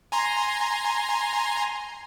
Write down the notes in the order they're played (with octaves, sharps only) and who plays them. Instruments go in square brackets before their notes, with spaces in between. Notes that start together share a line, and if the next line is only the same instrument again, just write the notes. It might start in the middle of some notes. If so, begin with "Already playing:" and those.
[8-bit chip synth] G#5 A#5 C6